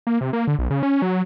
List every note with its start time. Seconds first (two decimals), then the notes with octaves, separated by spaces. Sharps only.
0.07 A#3
0.21 C3
0.33 A#3
0.47 D3
0.59 B1
0.70 C#3
0.83 C#4
1.02 F#3